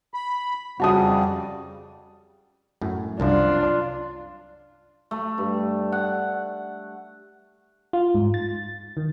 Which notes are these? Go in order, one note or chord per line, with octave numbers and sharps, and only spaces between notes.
B5
F2 C#3 G3 F#4 A5 D#6
F#2 A2
C2 F#2 F3 D4 F4
A3
G2
F#5
F4
G#2
A6
D#3